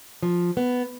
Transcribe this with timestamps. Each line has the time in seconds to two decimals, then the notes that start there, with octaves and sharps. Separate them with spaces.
0.23 F3
0.57 B3